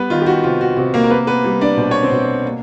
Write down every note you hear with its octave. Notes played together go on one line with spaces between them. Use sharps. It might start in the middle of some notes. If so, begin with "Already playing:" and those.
Already playing: G3 B3 B4
D#3 F4
G4
F#4
C3 F4
F#4
C3 F#4
A#3 A#4
A#4
A#3 B3 B4
B3 B4
G3
D4 D5
B2 C5
C#5
C4 C5
B2
A#3